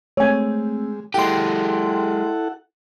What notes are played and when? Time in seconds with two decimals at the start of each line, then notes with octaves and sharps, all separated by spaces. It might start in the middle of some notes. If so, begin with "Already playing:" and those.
0.17 G#3 A3 C4 C#5 G#5
1.14 G#3 E4 G4 A4 F#5 G5 C6